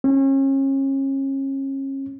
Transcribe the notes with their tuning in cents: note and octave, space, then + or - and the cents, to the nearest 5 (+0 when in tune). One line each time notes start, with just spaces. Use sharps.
C#4 -35